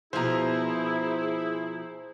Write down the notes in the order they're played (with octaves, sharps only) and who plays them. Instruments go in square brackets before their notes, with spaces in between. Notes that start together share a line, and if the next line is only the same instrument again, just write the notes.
[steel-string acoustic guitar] B2 F3 [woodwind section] E4 [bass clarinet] G#4 [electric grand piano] C5 A#5